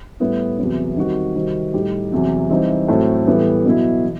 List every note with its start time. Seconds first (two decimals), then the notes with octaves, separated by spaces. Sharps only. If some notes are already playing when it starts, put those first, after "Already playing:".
0.20 A2 G3 B3 E4
0.58 E2 C3 F#3 B3
0.97 D#3 G3 C4 F#4
1.35 C3 D#3 G3 C4 F#4
1.74 A2 G3 D#4 G4
2.12 E2 C3 F#3
2.50 E3 G3 C4 D#4
2.88 A2 F#3 A3 C4
3.27 A2 E3 G3 B3
3.65 B2 F#3 B3 E4
4.04 E3